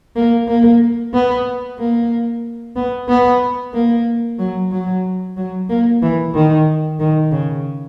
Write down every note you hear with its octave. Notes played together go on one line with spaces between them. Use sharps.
A#3
A#3
B3
A#3
B3
B3
A#3
F#3
F#3
F#3
A#3
E3
D#3
D#3
C#3